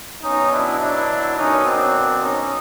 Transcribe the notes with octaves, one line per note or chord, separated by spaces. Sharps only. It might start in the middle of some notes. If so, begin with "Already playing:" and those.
B2 F#3 B3 C#4 D#4
D4 E4
D4 E4
B2 F#3 A#3 C#4 D#4
C4 D4
C#4 D#4